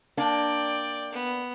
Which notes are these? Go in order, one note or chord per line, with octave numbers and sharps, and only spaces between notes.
A#3 D4 D5 G5
B3